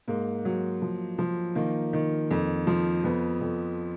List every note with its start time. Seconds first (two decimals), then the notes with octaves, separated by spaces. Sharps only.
0.08 G#2 A#3
0.45 F#3
0.82 F3
1.19 F3
1.55 D#3 A#3
1.93 D#3
2.31 F2
2.67 F3
3.04 F2 B3
3.41 F2